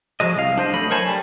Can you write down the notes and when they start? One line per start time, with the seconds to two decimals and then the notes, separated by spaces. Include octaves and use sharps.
0.20 F3 F#3 G#3 D#5
0.37 C2 F5
0.58 D4 C5 D#5
0.74 F#3 A3 D#5 B5
0.90 A#4 C5 C#5 G#5 A5 B5
1.08 G3